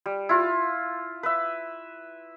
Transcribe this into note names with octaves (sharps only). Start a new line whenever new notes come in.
G3
E4 F4
B4 E5